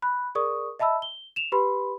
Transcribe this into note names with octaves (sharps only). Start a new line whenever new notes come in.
B5 F#6
G#4 A#4 D5 C#6 D#6
D#5 E5 A5 B5 E6
G7
E7 F7
G4 B4 B5 C6